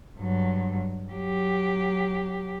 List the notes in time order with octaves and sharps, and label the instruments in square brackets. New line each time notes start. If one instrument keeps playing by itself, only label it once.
[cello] G2 F#3
F#3 G4